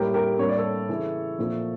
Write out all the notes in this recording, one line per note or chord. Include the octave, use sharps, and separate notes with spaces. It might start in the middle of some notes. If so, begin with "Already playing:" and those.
Already playing: A2 G3 A#3 G4 A#4
G4 A#4
A2 G3 A#3 C#5
D5
A4 C#5
C#3 E3 A3
A#2 F3 A3